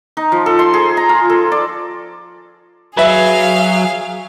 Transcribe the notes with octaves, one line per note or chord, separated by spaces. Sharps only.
D#4
F3
A4
C6
G#4
A#5
F4
A4
D5
F#3 G#4 B4 E5 F5